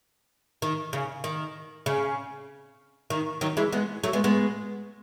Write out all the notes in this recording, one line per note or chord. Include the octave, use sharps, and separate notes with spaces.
D#3
C#3
D#3
C#3
D#3
D#3 F#3
E3 G#3
G#3 B3
F#3 A3
G#3 B3
G#3 B3